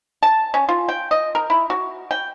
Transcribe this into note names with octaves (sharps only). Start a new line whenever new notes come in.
A5
C#4
F4
G5
D#5
A#4
E4
F#4
G5